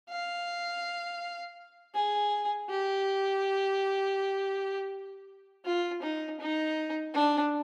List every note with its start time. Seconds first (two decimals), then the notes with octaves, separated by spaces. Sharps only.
0.10 F5
1.95 G#4
2.70 G4
5.65 F4
6.02 D#4
6.40 D#4
7.14 D4